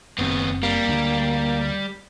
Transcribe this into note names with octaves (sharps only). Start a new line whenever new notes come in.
F#1 D#2 B3 C4
G3 A#3
D2 D3